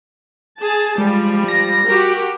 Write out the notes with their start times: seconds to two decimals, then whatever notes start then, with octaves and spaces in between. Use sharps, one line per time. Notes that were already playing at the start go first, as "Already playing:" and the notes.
0.60 G#4 A5
0.98 F3 G3 G#3
1.48 A#6
1.85 F#4 G4 A#4